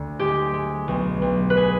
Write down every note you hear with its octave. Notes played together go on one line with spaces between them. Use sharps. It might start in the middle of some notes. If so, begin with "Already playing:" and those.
Already playing: D2
G#3 G4
G#3
B1
B1
B4
G#4